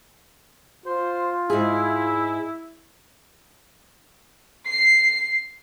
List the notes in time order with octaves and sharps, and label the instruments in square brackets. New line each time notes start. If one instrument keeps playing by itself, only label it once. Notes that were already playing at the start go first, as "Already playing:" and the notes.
[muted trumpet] F4 [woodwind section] C5
[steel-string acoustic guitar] G#2 G#4 [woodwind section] E4
[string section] C7